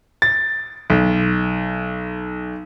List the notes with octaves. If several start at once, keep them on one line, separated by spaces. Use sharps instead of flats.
A6
B1